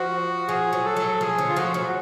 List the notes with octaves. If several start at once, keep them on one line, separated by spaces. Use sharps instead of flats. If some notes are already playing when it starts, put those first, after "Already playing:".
Already playing: F3 F#4
F3 G#4
F#3
A4
F#3
F3 G#4
D3
F4
F3 F#4
F#3